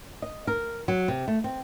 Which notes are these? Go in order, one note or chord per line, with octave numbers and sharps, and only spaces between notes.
D#5
A#4
F#3
C3
A3
C4